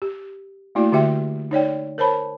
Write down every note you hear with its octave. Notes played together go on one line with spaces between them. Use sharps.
G4
A3 A#3 E4 F#4 D5
D3 F#4 G4 E5 G5
D#4 C#5 D5 G5
A#4 C5 C#5 A5 B5